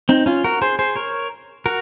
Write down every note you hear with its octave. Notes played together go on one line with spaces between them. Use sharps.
C4 D#4
C#4 F4
F#4 A#4
G#4 C5
G#4 C5
A#4 C#5
F#4 A#4